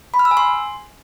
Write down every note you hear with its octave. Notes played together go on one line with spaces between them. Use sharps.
B5
F6
E6
G#5
C6